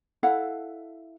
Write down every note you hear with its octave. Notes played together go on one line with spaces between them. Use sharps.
E4 A4 F5 F#5